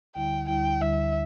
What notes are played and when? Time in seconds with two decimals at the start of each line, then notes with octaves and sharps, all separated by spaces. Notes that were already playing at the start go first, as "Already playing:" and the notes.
0.16 D2 D3 G3 E4 G5
0.48 D2 D3 G3 E4 G5
0.80 D2 D3 G3 E4 E5